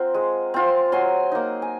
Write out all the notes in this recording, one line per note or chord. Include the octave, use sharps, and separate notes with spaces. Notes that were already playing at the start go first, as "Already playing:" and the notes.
Already playing: C4 F4 F#5 A#5
G#3
C4 F4
F#3 G#5 C6
A#3 D#4
G#5